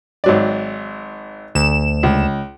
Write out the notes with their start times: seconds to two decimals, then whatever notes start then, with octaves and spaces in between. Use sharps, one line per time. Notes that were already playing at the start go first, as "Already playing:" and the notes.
0.24 G#1 F#3 D5
1.55 D2 E7
2.03 C#2